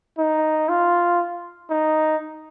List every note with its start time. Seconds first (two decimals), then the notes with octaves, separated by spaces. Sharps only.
0.19 D#4
0.69 F4
1.70 D#4